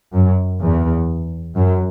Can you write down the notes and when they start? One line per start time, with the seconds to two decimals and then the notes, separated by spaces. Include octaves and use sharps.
0.13 F#2
0.60 E2
1.56 F#2